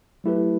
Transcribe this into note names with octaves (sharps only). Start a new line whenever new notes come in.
F#3 A3 E4 G4 B4